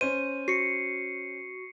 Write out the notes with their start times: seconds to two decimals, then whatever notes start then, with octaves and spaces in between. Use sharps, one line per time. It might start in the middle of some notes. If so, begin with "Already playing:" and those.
0.01 C#4 C5 D#7
0.48 F#4 C7 C#7